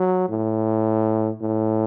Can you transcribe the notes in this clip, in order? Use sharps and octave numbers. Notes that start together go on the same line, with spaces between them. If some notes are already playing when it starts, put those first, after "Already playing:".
Already playing: F#3
A2
A2